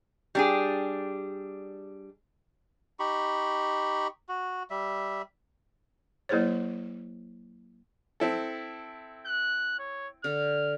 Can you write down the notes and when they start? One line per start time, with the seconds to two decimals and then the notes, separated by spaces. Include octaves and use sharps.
0.35 G3 D4 G#4
3.00 D#4 G4 B5 C#6
4.29 F#4
4.70 G3 E5
6.29 F#3 A#3 E4 G#4 C5 C#5
8.20 C4 E4 A4
9.26 F#6
9.79 C#5
10.24 D3 F6